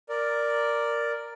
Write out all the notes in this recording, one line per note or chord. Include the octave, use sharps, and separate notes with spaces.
A#4 D5